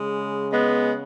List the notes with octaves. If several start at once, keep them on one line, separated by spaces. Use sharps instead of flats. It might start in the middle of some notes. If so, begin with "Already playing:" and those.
Already playing: C#3 G#3
G#3 B3